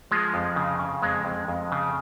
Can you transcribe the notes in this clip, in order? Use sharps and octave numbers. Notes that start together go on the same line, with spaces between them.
F3 G#3
F2
C#3
C#3
F2 G#3
F2
F2
C#3